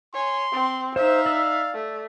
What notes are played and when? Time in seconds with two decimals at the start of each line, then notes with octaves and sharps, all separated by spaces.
0.14 C#5 G#5 C6
0.52 C4
0.96 D#4 C5 E5 F5
1.26 D5 E6
1.74 A3